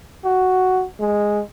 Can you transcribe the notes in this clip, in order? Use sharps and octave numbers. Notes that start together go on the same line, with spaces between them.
F#4
G#3